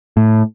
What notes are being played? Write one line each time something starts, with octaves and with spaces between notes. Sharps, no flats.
A2